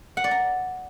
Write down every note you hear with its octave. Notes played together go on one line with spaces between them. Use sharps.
F#5
D5
A#5